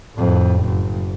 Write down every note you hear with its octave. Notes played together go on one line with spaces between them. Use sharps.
F2 A2
F#1